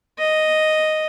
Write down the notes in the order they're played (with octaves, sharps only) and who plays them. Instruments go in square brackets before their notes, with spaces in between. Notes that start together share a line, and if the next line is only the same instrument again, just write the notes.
[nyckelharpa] D#5